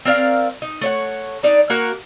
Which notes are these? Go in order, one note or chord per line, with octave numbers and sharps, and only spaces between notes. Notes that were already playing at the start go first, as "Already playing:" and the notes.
C4 A#4 D5 F5
D#4
A3 C#5 F#5
D4 D#4 D5
A#3 F#4 A#4